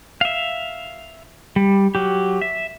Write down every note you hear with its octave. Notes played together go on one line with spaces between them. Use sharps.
E5 F5
G3
F#3 G4
E5